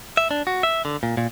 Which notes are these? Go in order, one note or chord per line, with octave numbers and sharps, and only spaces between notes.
E5
D4
F#4
E5
D3
A#2
A#2